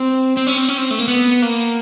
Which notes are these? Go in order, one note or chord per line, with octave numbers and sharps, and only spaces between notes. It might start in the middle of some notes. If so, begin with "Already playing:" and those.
Already playing: C4
C4
C#4
C4
C#4
C4
A3
A#3
B3
A#3